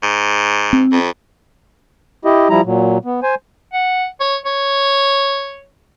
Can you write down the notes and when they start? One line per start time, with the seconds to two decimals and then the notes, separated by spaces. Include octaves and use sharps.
0.03 G#2
0.73 C4
0.92 F2
2.25 E4 G4 D#5
2.49 F3 G3 E4 A#5
2.65 A#2 F#3
3.05 B3
3.23 C5 G#5
3.73 F#5
4.21 C#5
4.46 C#5